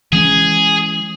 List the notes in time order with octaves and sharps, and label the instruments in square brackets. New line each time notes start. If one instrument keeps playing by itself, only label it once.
[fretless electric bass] E3 G#3 C#4 [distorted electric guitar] G#4